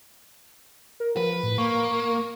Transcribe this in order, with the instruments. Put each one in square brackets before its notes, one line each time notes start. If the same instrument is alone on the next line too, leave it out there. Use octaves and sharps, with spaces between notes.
[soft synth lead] A#4
[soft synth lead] F3 [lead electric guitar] B4
[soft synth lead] A2
[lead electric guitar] A#3 [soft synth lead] C#6